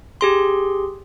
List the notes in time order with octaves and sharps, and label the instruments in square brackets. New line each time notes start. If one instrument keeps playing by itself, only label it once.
[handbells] G4 G#4 C6